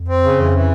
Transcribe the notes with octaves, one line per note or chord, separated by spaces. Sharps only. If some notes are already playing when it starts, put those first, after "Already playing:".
Already playing: F2
C4
C#3
F2 E3
E3